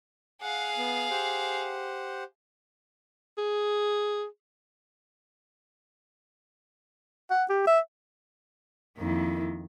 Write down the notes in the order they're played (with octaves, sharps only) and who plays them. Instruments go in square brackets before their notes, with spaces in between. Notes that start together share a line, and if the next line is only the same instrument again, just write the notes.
[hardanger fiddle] G#4 F5 [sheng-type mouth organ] F#5
[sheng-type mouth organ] B3
G4 C5 F#5
[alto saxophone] G#4
F#5
G4
E5
[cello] F2 D#3 [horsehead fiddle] A#3 E4